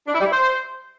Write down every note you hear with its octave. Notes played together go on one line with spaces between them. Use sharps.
D4
E4
G3
E4
C5